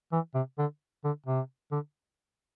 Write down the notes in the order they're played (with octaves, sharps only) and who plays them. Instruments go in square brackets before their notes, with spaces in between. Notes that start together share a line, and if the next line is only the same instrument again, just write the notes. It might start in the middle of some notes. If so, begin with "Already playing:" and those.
[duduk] E3
C3
D3
D3
C3
D3